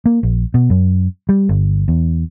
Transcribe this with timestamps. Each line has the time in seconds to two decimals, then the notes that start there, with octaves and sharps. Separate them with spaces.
0.06 A#3
0.23 A#1
0.54 B2
0.70 F#2
1.29 G3
1.49 G1
1.88 E2